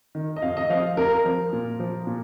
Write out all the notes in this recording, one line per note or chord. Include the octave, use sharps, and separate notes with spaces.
D#3
D#5
F2 F5
D#5
F3 F5
F2 A#4
F3
A#2
F3
A#2